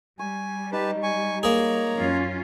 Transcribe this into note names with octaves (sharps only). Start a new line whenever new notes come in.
G3 G#5 C#6
D#4 G4 B4 A5
G#5 C#6
A#3 G#4 C#5 A#5
F#2 C#4 F4